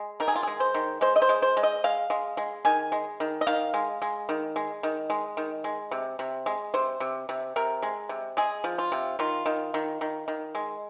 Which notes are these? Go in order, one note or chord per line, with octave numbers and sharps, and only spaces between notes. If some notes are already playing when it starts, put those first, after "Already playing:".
Already playing: G#3
D#3 A#4
G#4
F4
G#3 G#4
C5
D#3
G#3 C5
D#5
C5
G#3
C5
G#3
D#5
G#3 F5
G#3
G#3
D#3 G#5
G#3
D#3
D#5
D#3 F5
G#3
G#3
D#3
G#3
D#3
G#3
D#3
G#3
C3
C3
G#3
C3 C5
C3
C3
C3 A#4
G#3
C3
G#3 G#4
F3
F4
C3
D#3 F4
D#3
D#3
D#3
D#3
G#3